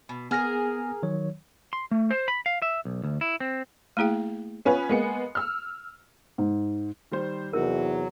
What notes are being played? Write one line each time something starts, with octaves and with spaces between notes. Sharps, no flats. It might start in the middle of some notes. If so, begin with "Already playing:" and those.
B2
B3 G#4 A#4 F6 A#6
D#3 F#3 C#5
C6
A3
C5
B5
F5
E5
B1
D2
E4
C4
A3 A#3 E4 G#4 G5
B3 C#4 F4 B4
G#3 A#3 B3 G#5 C#7
E6 F6
G#2
D#3 G3 C5
E2 C3 F#3 D#4 A#4